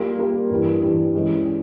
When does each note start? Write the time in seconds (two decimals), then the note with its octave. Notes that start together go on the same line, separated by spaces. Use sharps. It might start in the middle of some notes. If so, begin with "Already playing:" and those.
Already playing: G3 A#3 F4
0.19 G3 A#3 F4
0.50 G2 E3 G3
0.82 G2 E3 G3
1.13 E3 G#3 C#4 G4
1.45 C#4 G4